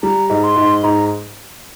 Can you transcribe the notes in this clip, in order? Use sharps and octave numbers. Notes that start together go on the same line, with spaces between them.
G3 A#5
G#2
C6
G#2
G#2 A#5